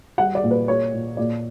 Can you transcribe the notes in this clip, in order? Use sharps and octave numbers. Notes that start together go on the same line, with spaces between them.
G3 F#5
D5
A#2
B4
A#3 C#5
A#2
A#2 D5